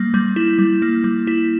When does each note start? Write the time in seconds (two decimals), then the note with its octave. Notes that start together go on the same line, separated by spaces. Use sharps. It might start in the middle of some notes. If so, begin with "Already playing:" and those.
Already playing: G3 A#3
0.14 G3
0.36 E4
0.59 G3
0.82 A#3
1.04 G3
1.27 E4